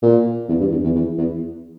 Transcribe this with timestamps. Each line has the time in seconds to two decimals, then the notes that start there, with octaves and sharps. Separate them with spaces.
0.03 A#2
0.49 E2
0.60 G2
0.71 E2
0.84 E2
0.95 E2
1.18 E2